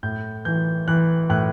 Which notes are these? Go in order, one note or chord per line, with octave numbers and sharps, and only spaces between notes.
A2 G6
E3 G6
E3 F#6
A2 F#6